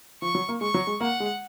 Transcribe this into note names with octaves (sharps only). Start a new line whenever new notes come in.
F3 C#6
F#3
A#3
G#3 C#6
F#3
G#3
A#3 F#5
G#3